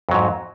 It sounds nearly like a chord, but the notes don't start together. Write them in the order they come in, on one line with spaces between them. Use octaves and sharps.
F2 F#3 G#2